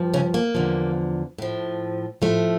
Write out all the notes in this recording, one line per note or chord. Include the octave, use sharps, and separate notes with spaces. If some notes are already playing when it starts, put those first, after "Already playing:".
Already playing: G2 F3
C#3 C#4
A#3
E2 D3 F3
A2 F3
A2 F3 A3